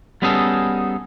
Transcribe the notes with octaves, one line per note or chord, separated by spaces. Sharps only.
G3 B3 C#4 D#4 G#4 A4